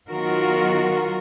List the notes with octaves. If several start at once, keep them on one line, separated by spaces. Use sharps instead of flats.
D#3 F#3 B3 F4 F#4 A#4